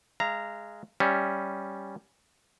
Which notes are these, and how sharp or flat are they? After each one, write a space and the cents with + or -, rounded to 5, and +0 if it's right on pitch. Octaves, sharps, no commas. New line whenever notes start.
G#3 +0 F5 -30 A#5 -5
G3 +0 C#4 +0 E5 +0